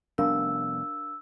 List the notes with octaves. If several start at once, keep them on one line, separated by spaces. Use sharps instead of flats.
F1 G3 B3 D4 A#4 F5 E6